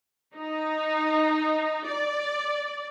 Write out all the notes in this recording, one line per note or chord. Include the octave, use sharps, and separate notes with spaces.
D#4
D5